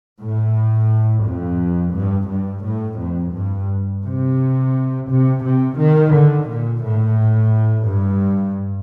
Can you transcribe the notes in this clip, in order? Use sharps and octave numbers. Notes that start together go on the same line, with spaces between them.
A2
F2
G2
G2
A2
F2
G2
C3
C3
C3
D#3
D3
A#2
A2
G2